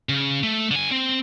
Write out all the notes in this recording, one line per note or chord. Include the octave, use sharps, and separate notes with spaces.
C#3
A3
D3 G#5
C4